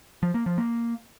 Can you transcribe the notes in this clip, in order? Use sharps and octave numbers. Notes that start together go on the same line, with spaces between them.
F3
A#3
F3
A#3